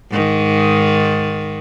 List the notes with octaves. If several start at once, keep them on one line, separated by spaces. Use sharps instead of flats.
G#2 D#3